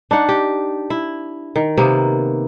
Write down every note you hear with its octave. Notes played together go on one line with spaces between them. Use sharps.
D4 D#4 F#5
G4
E4
D#3
C3 A#3 B3